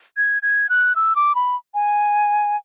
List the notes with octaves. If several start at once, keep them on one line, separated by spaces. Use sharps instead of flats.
G#6
G#6
F#6
E6
D6
B5
G#5